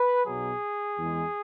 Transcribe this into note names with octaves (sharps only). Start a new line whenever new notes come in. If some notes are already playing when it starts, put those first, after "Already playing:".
Already playing: B4
B1 B2 F#3 G#4
E2 E3 G#3